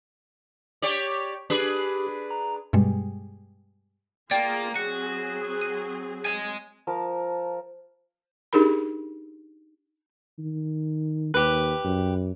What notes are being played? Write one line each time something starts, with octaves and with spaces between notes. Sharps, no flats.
G4 C#5 D5
D4 G4 G#4 B4
A#5
G2 B2 G3 G#3
A#3 F4 G#4 D5 G5
F#3 C4 F#4 G#4 C#7
D#7
D#5 G#5
F3 A#4 A5
D4 D#4 G4 G#4 A#4 B5
D#3
D#2 G4 B4
F#2